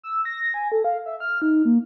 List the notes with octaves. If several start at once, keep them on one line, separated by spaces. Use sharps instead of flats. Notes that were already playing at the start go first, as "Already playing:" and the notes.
E6
A#6
G#5
A4
F5
E5
F6
D#4
A#3